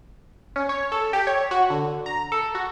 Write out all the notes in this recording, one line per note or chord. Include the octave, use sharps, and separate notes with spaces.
C#4
C#5
A4
G4
C#5
F#4
D3
A#5
A4
F#4